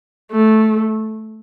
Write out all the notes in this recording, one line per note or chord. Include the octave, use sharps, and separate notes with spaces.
A3